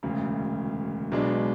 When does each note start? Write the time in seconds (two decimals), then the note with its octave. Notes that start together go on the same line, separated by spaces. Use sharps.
0.03 E1 D2 C#3
1.12 B1 B2 G#3 D4